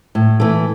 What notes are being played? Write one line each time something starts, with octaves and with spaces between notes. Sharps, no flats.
A2
E3 A3